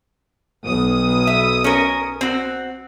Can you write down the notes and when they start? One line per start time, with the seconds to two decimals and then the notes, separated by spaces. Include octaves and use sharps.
0.65 B1 D#6
1.27 E5
1.64 C#4 A#4
2.21 C4 F#4